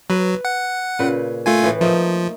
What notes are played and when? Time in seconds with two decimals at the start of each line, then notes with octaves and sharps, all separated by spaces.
0.10 F#3 B4
0.45 F#5
0.99 A#2 C#3 B4
1.46 A3 F4 G#5
1.63 A2 E3
1.81 F3 A3 A#3 D#4